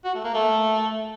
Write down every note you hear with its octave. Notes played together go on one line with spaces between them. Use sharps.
F#4
A3
A#3
A3